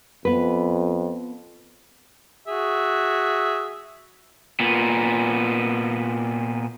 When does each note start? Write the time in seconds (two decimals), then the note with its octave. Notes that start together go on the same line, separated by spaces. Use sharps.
0.25 F2 B3 B4
2.48 F#4 G#4 E5
4.60 A#2 B3